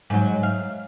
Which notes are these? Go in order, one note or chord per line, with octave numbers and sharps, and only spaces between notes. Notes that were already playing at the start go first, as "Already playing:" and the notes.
G#2 F#3
F5